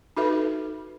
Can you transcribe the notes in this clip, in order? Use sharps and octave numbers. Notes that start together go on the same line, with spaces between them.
D#4 F#4 A4 B4 E5